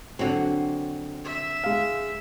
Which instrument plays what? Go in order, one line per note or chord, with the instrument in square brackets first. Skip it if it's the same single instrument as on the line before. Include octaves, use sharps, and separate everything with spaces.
[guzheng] D3 F#3 [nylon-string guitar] C4 F#4
[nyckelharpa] E5
[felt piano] G#3 F5